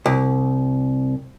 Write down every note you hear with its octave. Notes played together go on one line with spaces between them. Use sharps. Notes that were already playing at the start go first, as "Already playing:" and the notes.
C2